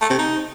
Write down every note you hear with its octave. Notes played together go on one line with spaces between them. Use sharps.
A3
C3
D#4